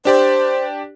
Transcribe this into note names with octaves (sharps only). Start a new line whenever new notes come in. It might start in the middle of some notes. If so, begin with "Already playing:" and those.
D4 G4 C5 D5